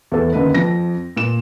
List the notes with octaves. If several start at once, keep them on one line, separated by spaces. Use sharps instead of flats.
E2 E3 A4
F#2 D3 D#3 A#3 B4
F2 F3 A#6
A#2 E7